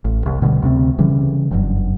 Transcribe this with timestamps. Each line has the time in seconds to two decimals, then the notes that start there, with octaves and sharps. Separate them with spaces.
0.05 A1
0.26 C2
0.42 B2 D3 F#3 G3
0.62 D2 C3 C4
0.99 C#3 E3 G3
1.51 F#1 G2 F#3